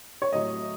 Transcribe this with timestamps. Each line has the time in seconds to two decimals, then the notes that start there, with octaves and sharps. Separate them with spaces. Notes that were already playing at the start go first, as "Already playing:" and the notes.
0.22 C#5
0.32 A2 F#3 D#5